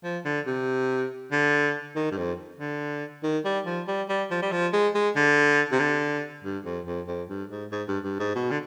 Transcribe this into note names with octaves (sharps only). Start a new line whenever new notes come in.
F3
D3
C3
D3
D#3
G2
F2
D3
D#3
G3
F3
G3
G3
F3
G3
F3
G#3
G#3
D3
C3
D3
G2
F2
F2
F2
G2
G#2
G#2
G2
G2
G#2
B2
D3